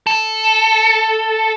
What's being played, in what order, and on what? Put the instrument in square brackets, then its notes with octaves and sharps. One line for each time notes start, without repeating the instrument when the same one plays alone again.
[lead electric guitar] A4